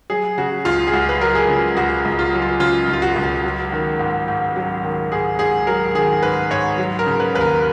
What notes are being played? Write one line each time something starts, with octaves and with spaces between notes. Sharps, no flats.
F#3 G#4
C#3 F#4
C#2 F4
G#4
C#2 F#4
B4
F#3 A#4
G#4
C#3
C#2 F#4
C#2
F4
F#3
F4
C#3 F4
C#2
F4
F#4
C#2
F#4
F#3
D#3
G#2
G#2
F#3
D#3
G#2 G#4
G#2 G#4
F#3 A#4
D#3 G#4
G#2 B4
G#2 C#5
F#3
A#4
C#3
B4
D#2 B4
A#4